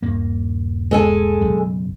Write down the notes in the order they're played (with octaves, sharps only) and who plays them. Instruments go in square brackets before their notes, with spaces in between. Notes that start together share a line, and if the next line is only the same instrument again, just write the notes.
[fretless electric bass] D#1 G2 A#3
[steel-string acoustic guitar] G#3 A4 G#5
[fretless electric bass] F#1 B1 F#2